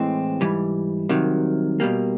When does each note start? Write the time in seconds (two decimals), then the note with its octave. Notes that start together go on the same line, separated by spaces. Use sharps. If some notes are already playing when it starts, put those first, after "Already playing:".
Already playing: A2 E3 G#3 C4
0.41 G#2 E3 G3
1.09 C2 C3 D#3 F#3
1.80 B2 G3 A#3